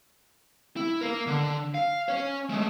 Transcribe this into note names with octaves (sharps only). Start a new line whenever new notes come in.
E4
A#3 A#4
D3
F5
C#4 C#5
G#3 A3